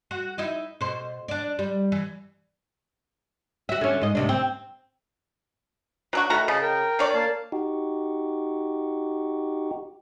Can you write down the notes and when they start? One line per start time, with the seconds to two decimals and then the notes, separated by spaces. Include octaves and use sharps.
0.11 F#4
0.38 D#4 E4 E5
0.81 B2 C5
1.28 D4 D5
1.59 G3
1.92 E3
3.69 F#4 E5
3.81 D3 C#4
4.01 G#2 D#5
4.15 D2 C3 D4
4.29 C4
6.13 F#3 D4 F#4
6.30 D#3 A3 F#4 A#5 B5
6.48 C#3 D#5 A5
6.62 A#4 G5
6.99 D3 C#5 D5
7.14 A#3 F5 A5
7.52 D#4 F#4 G4